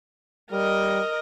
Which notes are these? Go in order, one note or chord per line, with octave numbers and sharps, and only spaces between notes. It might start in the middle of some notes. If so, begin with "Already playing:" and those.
G3 A#4 D#5